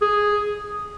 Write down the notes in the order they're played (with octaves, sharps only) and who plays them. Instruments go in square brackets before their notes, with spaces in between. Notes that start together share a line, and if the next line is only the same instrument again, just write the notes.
[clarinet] G#4